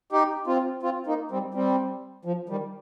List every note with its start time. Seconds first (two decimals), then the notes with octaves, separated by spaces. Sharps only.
0.12 D#4 G4
0.47 C4 F4
0.83 C4 F4
1.06 A#3 D#4
1.31 G3 C4
1.54 G3 C4
2.25 F3
2.49 D#3 G3